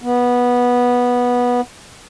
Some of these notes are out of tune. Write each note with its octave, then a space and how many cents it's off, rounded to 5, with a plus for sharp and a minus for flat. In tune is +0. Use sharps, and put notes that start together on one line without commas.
B3 -10